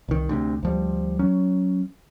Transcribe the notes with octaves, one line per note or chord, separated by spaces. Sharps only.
C2 D#3
D2 C3
D2 F3 G3
F#3 C#4